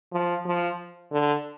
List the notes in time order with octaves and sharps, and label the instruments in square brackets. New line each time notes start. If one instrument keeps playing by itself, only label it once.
[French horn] F3
F3
D3